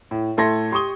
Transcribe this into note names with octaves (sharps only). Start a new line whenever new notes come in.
A2
A2 A3 A4 C6 G#6 A#6
G4 C6 C#6 D#6 G7